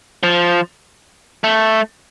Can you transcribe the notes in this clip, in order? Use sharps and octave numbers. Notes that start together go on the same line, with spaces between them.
F3
A3